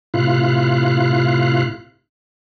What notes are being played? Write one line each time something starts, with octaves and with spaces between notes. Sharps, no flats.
A2 C3 E4 F4 F5 F#6